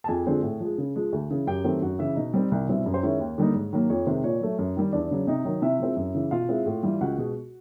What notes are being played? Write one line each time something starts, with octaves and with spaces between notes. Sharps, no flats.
A5
F2 G#4 G#5
D3 F3 G#3 C4
A2
F3 G#3
C#3
F3 G#3
D2
C#3 E3
F#2 G4 G5
D#3 F#3 A3 C4
F#2 F#4 F#5
C#3 E3 E4 E5
B2 D#4 D#5
G3 C4
C2
B2 G3 C4 E4
F#2
C5
D#3 G#3 C#4 E4 C#5
D#2
D3 G3 A#3 D#4
G#2
D#3 F#3 A#3
F2 C#5
C3 D#3 G#3 C5
A#2 C#5
F#3 A3
F#2
D#3 G3
E2 D4 D5
C#3 F#3
C3 D#4 D#5
D#3 F#3
C3 E4 E5
F3 G#3 C4
F#2
C#3 E3
B2 F4 F5
G#3 C4 E4
A2
E3 G3
C#2 F#4 F#5
B2 G#3